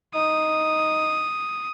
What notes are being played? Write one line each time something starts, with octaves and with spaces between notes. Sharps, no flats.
D#4 D#6